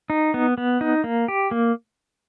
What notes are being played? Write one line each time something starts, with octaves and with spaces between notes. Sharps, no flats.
D#4
B3
B3
D#4
A#3
G4
A#3